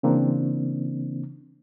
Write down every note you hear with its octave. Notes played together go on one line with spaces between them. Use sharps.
C#3 E3 A#3 C4 D4